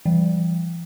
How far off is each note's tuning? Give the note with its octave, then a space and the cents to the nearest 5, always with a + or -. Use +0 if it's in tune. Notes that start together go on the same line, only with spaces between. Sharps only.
E3 +45 G3 +0